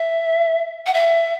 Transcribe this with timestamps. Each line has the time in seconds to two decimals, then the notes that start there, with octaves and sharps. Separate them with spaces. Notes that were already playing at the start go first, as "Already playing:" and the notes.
Already playing: E5
0.86 F#5
0.94 E5